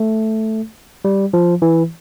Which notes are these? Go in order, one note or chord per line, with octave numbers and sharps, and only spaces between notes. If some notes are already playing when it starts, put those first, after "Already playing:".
Already playing: A3
G3
F3
E3